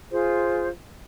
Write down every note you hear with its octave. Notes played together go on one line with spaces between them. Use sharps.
F4 G#4 C5